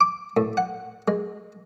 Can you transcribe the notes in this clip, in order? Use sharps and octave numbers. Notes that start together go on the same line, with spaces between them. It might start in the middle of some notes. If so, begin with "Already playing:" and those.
D6
A2
F#5
G#3